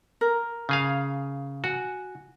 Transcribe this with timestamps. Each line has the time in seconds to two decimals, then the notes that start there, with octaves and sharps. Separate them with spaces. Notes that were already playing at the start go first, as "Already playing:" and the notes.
0.21 A#4
0.69 C#3 G#4 F5
1.64 F#4 G#5